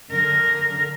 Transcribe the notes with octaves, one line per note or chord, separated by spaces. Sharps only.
D3 A#4